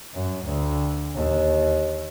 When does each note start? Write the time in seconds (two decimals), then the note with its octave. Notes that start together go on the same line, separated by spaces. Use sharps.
0.14 F#2
0.45 D2
1.15 D#2